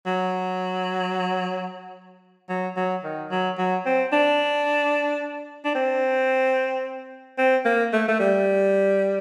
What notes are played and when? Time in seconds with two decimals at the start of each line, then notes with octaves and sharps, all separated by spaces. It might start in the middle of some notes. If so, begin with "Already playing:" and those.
0.06 F#3
2.49 F#3
2.77 F#3
3.04 D#3
3.31 F#3
3.58 F#3
3.86 C4
4.13 D4
5.65 D4
5.75 C4
7.38 C4
7.65 A#3
7.93 A3
8.08 A3
8.20 G3